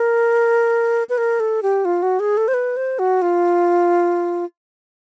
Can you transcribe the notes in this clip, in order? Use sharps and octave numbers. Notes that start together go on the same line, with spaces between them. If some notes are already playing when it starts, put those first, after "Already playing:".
Already playing: A#4
B4
A#4
A4
G4
F4
F#4
G#4
A4
C5
B4
C5
F#4
F4